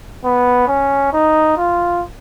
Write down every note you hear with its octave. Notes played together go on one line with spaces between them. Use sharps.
B3
C#4
D#4
F4